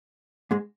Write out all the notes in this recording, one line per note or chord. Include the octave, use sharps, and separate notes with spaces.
G#2 G#3